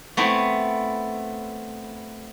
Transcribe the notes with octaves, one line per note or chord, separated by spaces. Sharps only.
A3 B3 C4 E4